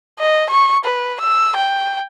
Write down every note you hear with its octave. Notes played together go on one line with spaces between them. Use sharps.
D#5
C#6
B4
E6
G5